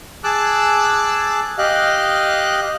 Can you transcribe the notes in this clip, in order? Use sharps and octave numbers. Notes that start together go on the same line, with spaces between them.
G#4 A5 D6 E6 F#6
G4 D#5 F5 F#6